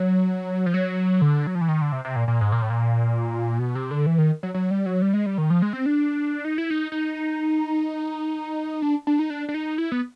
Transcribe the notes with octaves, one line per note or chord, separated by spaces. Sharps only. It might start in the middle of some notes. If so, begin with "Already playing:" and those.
Already playing: F#3
F3
F#3
D3
F#3
F3
E3
D#3
D3
C3
C3
A#2
A#2
G#2
A#2
A2
A#2
B2
C3
D3
E3
D#3
F#3
F#3
G3
F#3
G3
G#3
G3
D#3
F3
G#3
C4
D4
D#4
E4
D#4
D#4
D4
D4
D#4
D4
D4
D#4
E4
B3